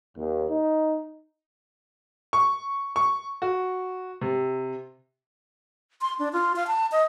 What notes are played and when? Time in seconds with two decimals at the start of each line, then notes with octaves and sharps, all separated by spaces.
0.16 D#2
0.49 D#4
2.33 C#6
2.96 C#6
3.42 F#4
4.21 C3
6.01 C6
6.19 D4
6.33 F4
6.56 F5
6.67 A5
6.92 D#5